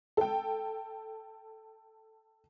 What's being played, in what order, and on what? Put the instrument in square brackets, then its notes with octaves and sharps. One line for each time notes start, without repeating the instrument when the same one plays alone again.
[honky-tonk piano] A4 G5